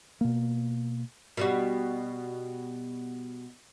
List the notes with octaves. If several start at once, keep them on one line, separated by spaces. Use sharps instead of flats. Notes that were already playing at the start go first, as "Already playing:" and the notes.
B2 A#3
B2 G3 F#4